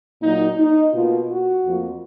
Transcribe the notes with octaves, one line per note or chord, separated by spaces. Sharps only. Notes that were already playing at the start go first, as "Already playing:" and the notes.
A#2 F#3 A#3 D#4
D#4
B2 A#3 F4
F#4
F2 F3 A#3